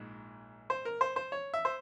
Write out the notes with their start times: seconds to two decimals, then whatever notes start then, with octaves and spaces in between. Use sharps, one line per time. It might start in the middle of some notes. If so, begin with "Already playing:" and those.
Already playing: A#1 G#2
0.70 C5
0.85 A#4
1.01 C5
1.16 C5
1.32 C#5
1.54 E5
1.65 C5